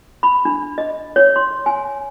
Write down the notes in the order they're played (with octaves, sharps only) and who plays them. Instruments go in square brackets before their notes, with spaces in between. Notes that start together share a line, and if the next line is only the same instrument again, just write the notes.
[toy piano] B5
D4
D#5
C#5
C6
G#5